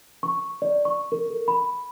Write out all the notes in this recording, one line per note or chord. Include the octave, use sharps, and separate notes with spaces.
C#6
D5
C#6
A#4
A4
B5